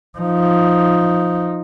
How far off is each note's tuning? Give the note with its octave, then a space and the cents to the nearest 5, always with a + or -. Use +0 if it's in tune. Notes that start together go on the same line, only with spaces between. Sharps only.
F3 +0 D#4 +0